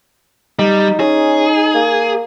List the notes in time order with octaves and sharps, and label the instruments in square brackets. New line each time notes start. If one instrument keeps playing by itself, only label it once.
[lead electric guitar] G3 [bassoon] D#4
[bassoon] C#4 [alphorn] D#4 [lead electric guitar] G#4
[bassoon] A#3